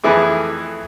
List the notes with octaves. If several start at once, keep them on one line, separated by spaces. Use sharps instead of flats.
F2 E3 A3 E4 G#4 D6